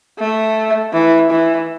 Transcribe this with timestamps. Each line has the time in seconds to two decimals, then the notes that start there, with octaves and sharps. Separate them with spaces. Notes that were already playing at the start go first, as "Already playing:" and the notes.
0.19 A3
0.94 E3
1.31 E3